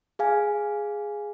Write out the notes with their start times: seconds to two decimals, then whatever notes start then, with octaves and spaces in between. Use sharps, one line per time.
0.19 G#4 F5 G#5